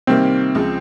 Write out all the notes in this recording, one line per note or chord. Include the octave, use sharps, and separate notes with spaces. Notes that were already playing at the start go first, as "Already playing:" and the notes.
C3 D#3 G3 A#3 C4
C#2 C#3 F3 G#3